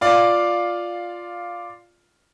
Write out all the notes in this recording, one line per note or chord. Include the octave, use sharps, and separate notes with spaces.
F4 D5 F5